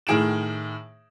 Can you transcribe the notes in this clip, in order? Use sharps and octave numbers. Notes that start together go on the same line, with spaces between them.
A2 D#3 G#4 D7 E7